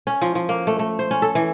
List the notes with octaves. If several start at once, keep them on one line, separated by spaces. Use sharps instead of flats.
C#4
F3
F3
A#3
A3
A3
C5
C#4
A4
E3